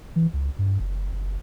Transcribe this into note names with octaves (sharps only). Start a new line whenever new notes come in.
E3
C#2
G2
F#1
F#1